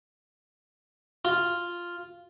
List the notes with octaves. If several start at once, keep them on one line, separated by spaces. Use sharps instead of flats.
F4